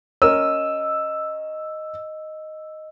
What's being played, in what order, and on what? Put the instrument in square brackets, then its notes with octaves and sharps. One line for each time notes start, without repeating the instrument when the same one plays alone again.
[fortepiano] C#4 A#4 [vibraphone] D#5 [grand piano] E6